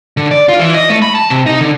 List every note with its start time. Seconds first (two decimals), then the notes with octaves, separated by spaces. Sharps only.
0.17 D3
0.31 D5
0.49 F4
0.60 E3
0.74 D#5
0.90 A3
1.02 B5
1.15 A5
1.30 C3
1.46 D#4
1.61 D3